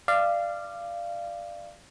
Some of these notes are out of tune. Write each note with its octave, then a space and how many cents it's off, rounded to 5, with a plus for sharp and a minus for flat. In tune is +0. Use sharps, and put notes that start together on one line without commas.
D5 +15 F5 -20